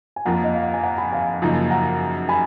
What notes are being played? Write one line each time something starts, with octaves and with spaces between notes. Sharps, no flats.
G#5
F2 F3 A#3 F4 F#5 A#5
D#5
F5
F#5
G#5
F#5 A#5
G#5 B5
F5 G#5
F#2 C#3 F3 A#3 D#4
F#5 A#5
G#5 B5